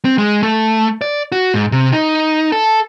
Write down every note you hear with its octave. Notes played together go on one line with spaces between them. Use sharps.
C4
G#3
A3
D5
F#4
G#2
C3
D#4
A4